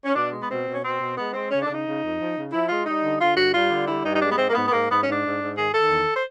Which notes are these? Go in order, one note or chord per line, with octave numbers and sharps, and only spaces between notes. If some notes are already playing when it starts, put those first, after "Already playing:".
C#4
B2 D4
G#3
B3
B2 C4
B2
C#4
B2 C4
B2
G#3 B3
G#3 C4
C#3 C#4
D4
C#3
D#4
C#3
F2
F3
C#3
F3 E4
G#3 F4
G3 D#4
D3
D3 F4
G2 F#4
G3 F4
D3
G3 E4
G2 D#4
D#4
G#3 D4
B3
G#2 C4
A#3
G#2 B3
B3
G#2 A#3
G#2 B3
G#2 C#4
D4
G#2
G#2
D#3 G#4
D#3 A4
E2
C5